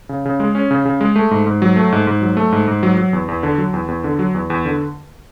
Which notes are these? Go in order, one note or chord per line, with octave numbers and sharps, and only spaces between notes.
C#3
C#3
G#3
C#4
C#3
C#3
G#3
A3
G#2
G#2
F#3
A3
G#2
G#2
F#3
A3
G#2
G#2
F#3
F#3
E2
E2
D3
F#3
E2
E2
D3
F#3
E2
E2
D3